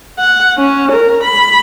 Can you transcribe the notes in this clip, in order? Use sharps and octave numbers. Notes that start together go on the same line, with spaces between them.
F#5
C#4
A#4
B5